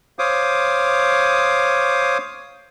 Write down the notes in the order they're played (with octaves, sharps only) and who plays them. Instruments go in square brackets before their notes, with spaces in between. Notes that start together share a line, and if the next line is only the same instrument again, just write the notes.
[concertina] C5 C#5 F5 D6 D#6